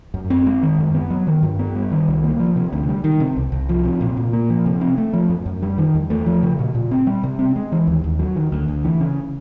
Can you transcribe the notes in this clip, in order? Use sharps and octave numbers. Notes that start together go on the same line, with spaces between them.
F#2
C4
G#3
D#3
F#2
B3
F#3
D#3
G2
B3
G3
D#3
C2
A#3
F3
C3
D2
G3
D#3
C3
C2
C2
F3
C3
A#2
A#2
A#3
F3
C3
C4
A3
F3
F#2
F#2
G3
D#3
E2
A3
F3
C#3
A#2
A#2
C4
G3
C3
C4
G#3
E3
D#2
D#2
F#3
D#3
D2
D2
E3
C#3